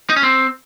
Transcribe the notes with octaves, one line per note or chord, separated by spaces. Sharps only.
D#4
C#4
C4